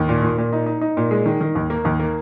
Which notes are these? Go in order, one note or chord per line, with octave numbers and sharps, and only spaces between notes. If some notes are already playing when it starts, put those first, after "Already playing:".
Already playing: D#2
A#2
A#2
A#2
D#4
D#4
D#4
A#2
G#3
D#3
D#3
D#2
A#3
D#2
A#3